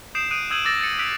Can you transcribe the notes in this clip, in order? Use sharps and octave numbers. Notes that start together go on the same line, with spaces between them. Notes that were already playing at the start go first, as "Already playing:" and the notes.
D#6 G6 C7 D7 E7
D#6 F#6 D7 D#7
D#6 E6 G6 G#6 D#7 F#7
D6 E6 A6 A#6
A6 C#7
E6 F#6 B6 D7 F7